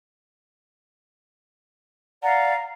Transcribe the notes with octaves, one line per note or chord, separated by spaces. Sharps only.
D5 F5 F#5 A#5